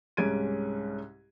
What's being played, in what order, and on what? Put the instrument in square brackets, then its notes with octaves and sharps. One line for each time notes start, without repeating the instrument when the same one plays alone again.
[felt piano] C2 G#2 C#4 G#6 D7 D#7